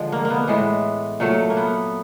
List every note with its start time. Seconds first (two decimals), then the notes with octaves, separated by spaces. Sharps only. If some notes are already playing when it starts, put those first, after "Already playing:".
Already playing: D3 F3 G#3
0.12 A#3
0.25 A#3
0.30 B3
0.47 A2 E3 G#3 B3
1.20 A#2 F#3 A3
1.50 A#3
1.57 B3